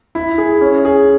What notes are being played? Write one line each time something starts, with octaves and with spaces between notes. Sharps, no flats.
E4
G#4
C#4
G#4